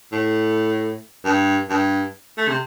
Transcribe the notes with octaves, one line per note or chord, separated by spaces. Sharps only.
A2
G2
G2
A3
C3